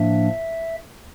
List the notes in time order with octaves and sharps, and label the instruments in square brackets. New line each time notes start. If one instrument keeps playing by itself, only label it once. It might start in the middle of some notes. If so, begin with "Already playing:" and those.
Already playing: [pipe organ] A2 F3 A#3 D4 E5